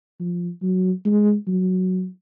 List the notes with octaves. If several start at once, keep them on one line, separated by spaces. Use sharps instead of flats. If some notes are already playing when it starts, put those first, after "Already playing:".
F3
F#3
G#3
F#3